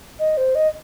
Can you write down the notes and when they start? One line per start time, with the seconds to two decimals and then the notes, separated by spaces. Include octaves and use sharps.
0.20 D#5
0.37 C5
0.55 D#5